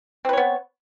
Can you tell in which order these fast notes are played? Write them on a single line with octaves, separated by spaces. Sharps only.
C4 B4 C#5 B3